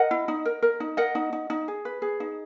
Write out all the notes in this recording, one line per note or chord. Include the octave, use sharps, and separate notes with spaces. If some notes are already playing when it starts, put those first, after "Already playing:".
Already playing: A#4 D#5 F#5
E4
D#4
A#4
A#4
D#4
A#4 D#5 F#5
D#4
D#4
D#4
G#4
B4
G#4
D#4